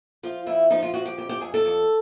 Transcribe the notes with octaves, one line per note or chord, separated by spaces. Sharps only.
F3 F4
F2 E4
F3 D#4
F4
F3 F#4
G4
F2 G4
G4
F2 G#4
A4
F2